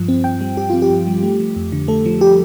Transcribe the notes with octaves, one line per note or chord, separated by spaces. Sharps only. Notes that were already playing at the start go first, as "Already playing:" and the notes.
Already playing: G2 F3
C4
G2 G5
G3
G2 G4
C4 F4
G4
G2
G3
A3
F3
F2
D3
A3 A4
F3
G4